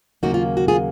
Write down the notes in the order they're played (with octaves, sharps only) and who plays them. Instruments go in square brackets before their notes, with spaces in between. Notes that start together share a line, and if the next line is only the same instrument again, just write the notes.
[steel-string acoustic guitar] D#2 C#3 F#3 A#3 D#4 F#4
F4
F#4
F4 G#4